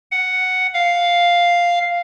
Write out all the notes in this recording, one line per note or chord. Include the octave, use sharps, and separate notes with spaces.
F#5
F5